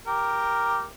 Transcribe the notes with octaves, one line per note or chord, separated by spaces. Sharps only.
G4 A#4